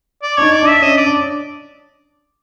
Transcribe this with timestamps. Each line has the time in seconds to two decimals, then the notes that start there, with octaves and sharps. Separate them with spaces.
0.23 D5
0.37 D4 C#5
0.42 D#4
0.52 D5
0.62 D4
0.68 E5
0.82 C#4 D#5
0.97 D5
1.06 D4